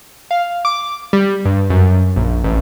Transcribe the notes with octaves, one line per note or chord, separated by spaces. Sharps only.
F5
D6
G3
G2
F#2
A#1
A1